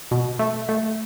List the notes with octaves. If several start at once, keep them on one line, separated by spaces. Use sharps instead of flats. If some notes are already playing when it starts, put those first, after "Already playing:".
B2
A3
A3